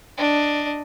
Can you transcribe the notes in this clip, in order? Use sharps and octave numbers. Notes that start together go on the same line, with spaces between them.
D4 D#5